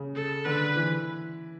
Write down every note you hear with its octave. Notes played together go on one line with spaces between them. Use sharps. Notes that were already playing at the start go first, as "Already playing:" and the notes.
Already playing: C#3
A4
D3 B4
E3